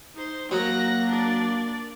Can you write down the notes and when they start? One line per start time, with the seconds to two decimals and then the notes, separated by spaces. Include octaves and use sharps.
0.15 D#4 C5
0.51 F#3 A#3 F#6 A#6
1.10 D4 D5